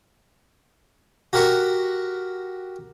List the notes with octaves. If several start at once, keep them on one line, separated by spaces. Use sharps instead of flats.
F#4 G4 A#4 F#5 B5 C#6